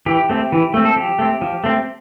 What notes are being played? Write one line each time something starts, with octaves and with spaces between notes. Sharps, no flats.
E3 G4
A3 C4
E3
A3 C4
A4
F3 G4
A3 C4
F3
A3 C4